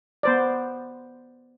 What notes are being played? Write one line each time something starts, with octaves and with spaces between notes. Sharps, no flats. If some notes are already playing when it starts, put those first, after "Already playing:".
B3 C5 D5